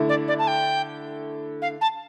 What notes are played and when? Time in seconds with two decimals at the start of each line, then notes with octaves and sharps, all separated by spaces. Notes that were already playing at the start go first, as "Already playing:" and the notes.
Already playing: D3 A3 E4
0.09 D5
0.28 D5
0.39 A5
0.47 G5
1.62 F5
1.81 A5